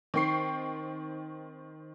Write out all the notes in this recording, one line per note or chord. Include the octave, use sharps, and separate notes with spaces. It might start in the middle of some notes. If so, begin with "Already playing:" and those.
D#3 C4 G5 C#6 C7